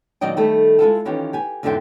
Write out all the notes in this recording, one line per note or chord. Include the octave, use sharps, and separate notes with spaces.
A#2 D#3 F#3 D5 D#5 G5
D#3 G3 A3 G4 A4
G#3 E4 F4 A4
D#3 E3 C#4 F4 G4
G4 G#5
E2 G#2 D3 F4 E5 G5